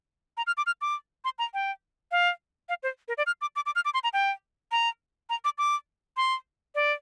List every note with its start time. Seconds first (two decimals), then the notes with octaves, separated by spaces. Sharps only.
0.37 A#5
0.47 F6
0.57 D6
0.66 F6
0.81 D6
1.25 C6
1.39 A#5
1.54 G5
2.11 F5
2.69 F5
2.83 C5
3.08 A#4
3.18 D5
3.27 F6
3.41 D6
3.56 D6
3.66 D6
3.75 F6
3.85 D6
3.94 C6
4.04 A#5
4.13 G5
4.72 A#5
5.30 A#5
5.45 D6
5.58 D6
6.17 C6
6.75 D5